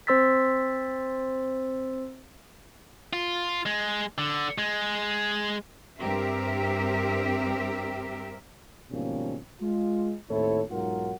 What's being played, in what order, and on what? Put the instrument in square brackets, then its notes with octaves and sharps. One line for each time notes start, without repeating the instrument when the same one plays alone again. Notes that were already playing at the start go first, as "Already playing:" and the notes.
[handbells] C4 C5 C6 E6 A6 B6
[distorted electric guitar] F4
G#3
D3
G#3
[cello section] G2 C4 G4 A#4 E5
[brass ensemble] G#1 B2 F3 G3 A#3 C#4
G#3 F4
D#2 A2 C4 E4 A4 C#5
B1 G#2 F#3 F4 A#4 F#5